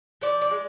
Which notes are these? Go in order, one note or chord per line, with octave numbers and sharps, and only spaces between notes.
F3 D5
D5
G#3